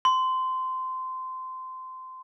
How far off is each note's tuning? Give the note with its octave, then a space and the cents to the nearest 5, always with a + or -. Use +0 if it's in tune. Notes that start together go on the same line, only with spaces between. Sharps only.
C6 -20